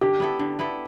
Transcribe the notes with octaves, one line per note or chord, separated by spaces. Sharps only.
D3 G4
B3 E4 A4
D3
B3 E4 A4